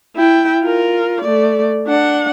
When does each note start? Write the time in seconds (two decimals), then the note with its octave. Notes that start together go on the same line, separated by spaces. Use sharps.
0.16 E4 G5
0.63 F4 A#4
1.21 A3 D5
1.87 D4 F#5